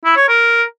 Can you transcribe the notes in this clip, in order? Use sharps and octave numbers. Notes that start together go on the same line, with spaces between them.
E4
C#5
A#4